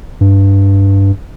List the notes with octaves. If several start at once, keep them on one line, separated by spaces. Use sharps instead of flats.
G2